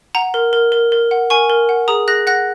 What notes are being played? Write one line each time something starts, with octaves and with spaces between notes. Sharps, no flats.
F#5 A#5
A#4
A#4
A#4
A#4
F#5
A#4 G#5 C#6
A#4
F#5
G#4 A#5 D#6
G#4 F#6 A#6
F#5 F#6 A#6